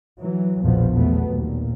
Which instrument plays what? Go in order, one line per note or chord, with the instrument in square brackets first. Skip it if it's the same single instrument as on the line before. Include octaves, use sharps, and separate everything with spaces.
[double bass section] E3 F#3
A#1 E2 B2 F3 B3
E2 B2 F#3 A3 B3
D#2 A#2